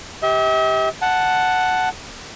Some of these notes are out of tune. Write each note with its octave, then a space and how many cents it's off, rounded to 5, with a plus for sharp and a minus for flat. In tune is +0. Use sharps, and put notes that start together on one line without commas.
G4 +0 E5 -45
F#5 +0 A5 +0